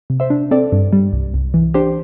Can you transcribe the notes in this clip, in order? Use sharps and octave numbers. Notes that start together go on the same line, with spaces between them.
C3
C5 E5
D4
C4 A4 D5
G2
G3
C2
C2
E3
D4 G4 C5